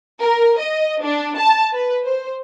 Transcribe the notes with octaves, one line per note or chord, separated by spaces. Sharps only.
A#4
D#5
D4
A5
B4
C5